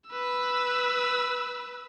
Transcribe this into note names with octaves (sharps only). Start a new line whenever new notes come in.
B4 E6